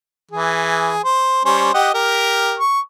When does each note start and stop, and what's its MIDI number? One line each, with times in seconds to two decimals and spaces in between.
0.31 0.99 52
0.31 0.99 68
1.04 1.42 72
1.45 1.70 55
1.45 1.70 61
1.45 1.70 72
1.74 1.89 67
1.74 1.89 75
1.74 1.89 78
1.94 2.58 67
1.94 2.58 70
2.59 2.80 85